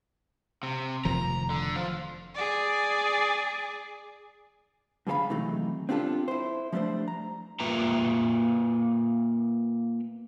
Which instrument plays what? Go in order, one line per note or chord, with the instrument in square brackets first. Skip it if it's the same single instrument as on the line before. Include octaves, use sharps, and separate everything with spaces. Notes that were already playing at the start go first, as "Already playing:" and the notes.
[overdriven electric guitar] C3
[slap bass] F1 D#3 F3 [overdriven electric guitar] A#5
[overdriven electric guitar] D3
F3
[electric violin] G#4 D5
[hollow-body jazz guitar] G2 D3 G#4 A4 F5 B5
C3 D#3 E3 F#3 A3 D#4
C4 D4 F4 G4 A4
E4 C5
F3 G3 A3 C#4 D4 C5
A#5
[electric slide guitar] A#3 F4 B4 E5 G5 A#5